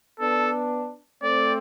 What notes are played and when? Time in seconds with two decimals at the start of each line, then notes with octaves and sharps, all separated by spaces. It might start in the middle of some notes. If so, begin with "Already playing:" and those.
0.20 B3 D4 A4
1.22 A3 C4 D5